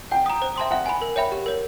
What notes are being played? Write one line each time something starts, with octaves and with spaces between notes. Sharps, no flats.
F#5 G5
A#5 D#6
C5
E5 A5 C6 D#6
E5 F#5
G#5 B5
A#4
C#5 E5 G5 B5
G4
A#4 C#5